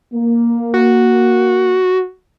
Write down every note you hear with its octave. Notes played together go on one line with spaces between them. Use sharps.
A#3
F#4